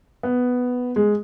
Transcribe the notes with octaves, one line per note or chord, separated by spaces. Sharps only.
B3
G#3